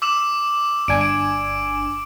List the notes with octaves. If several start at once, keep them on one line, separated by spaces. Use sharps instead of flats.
D6 E6 E7
G1 D4 G#5 D7
D7